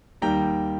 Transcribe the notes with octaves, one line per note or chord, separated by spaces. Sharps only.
D#2 D#3 G3 G5 A#5